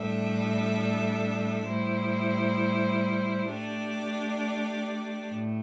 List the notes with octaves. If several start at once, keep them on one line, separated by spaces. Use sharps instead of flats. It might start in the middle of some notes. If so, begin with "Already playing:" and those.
Already playing: A2 G3 D4 A4 E5
A2 G3 E4 C5
A3 D4 G4 D5
A2